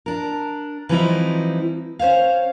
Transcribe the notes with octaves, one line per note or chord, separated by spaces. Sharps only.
D4 A#4
E3 F3 G3 C4 D#4 E4
C#4 C5 C#5 F5